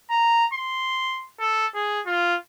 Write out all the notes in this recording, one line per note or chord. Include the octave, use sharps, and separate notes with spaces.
A#5
C6
A4
G#4
F4